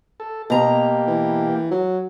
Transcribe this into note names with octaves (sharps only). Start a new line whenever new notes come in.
A4
B2 A#3 G4 A#5
E3
F#3